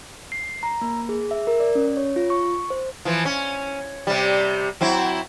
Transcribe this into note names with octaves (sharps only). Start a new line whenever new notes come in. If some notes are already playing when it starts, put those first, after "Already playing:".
C7
A#5
A#3
G#4
E5
A#4
D5
C#4
C#5
F4
C#6
C5
E3 F3
C#4
C3 G3
F#3 C4 E4